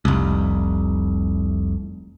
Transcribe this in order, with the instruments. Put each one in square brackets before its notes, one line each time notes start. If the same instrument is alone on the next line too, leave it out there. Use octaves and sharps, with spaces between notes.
[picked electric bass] F1 C2